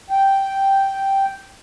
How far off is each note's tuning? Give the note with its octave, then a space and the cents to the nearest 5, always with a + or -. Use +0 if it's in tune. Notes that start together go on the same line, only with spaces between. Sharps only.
G5 -5